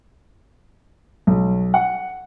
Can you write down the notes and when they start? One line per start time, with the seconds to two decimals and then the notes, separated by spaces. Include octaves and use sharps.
1.27 B1
1.74 F#5